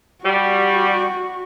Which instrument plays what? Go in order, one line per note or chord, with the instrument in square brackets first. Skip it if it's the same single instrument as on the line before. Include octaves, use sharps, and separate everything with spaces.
[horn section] G3 [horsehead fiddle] F#4